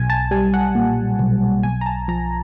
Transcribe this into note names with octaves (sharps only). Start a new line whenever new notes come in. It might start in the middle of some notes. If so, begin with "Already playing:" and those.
Already playing: B1 G#5
A5
G3 G#5
F#5
A#2
B1
B1 G#5
A#5
A5
F3 A#5